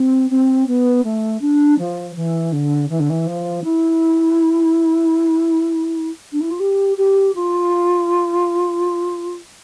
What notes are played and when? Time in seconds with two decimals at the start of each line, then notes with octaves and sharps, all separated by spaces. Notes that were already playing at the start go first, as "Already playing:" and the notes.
Already playing: C4
0.30 C4
0.67 B3
1.04 A3
1.41 D4
1.78 F3
2.15 E3
2.52 D3
2.89 E3
2.99 D3
3.09 E3
3.26 F3
3.63 E4
6.32 D4
6.40 E4
6.50 F4
6.59 G4
6.97 G4
7.34 F4